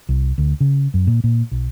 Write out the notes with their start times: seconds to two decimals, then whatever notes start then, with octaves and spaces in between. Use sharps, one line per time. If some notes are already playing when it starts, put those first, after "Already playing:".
0.09 C2
0.38 D2
0.60 C#3
0.94 F#2
1.07 A#2
1.24 A#2
1.52 B1